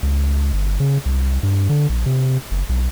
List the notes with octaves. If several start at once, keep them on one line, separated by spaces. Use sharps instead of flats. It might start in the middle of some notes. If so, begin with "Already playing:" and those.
C#2
G1
C#3
C2
G2
D3
A#1
C3
F#1
B1